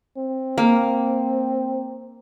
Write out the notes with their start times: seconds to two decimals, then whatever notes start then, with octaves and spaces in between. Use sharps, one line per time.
0.17 C4
0.58 A#3